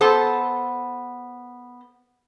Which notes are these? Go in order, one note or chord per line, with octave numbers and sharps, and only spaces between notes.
B3 A4 C5 A5